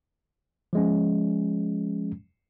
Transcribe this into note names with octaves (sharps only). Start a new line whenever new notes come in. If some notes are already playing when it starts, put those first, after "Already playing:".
F3 G#3 C#4